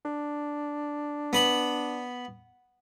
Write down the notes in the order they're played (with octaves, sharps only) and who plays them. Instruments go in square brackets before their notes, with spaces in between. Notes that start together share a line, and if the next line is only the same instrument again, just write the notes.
[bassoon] D4
[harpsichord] B3 B5